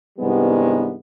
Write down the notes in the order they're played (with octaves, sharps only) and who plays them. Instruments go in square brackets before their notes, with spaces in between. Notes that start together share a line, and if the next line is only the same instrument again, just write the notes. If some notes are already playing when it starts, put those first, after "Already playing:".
[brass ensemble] C2 G2 D#3 G3 G#3 B3